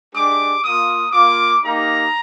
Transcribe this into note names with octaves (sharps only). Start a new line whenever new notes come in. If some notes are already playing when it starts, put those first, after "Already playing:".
G#3 D4 G4 D6
A#3 F4 D#6
A#3 F4 D6
A#3 D#4 G4 A#5